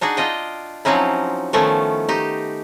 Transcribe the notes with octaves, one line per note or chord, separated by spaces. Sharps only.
D4 D#4 F#4 G#4
D4 F4 D#5 G5
F3 F#3 C4 C#4 D#4 E4
D#3 F3 A3 B3 C#4 E4
D#4 G4